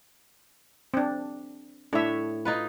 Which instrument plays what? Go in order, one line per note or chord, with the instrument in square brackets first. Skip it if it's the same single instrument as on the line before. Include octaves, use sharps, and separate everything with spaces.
[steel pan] C4 D4
[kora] A2 C#5 [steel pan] D4 E5
[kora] D#4 F4 B4